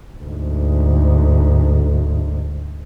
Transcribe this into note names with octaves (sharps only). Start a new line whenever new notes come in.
D2 G#2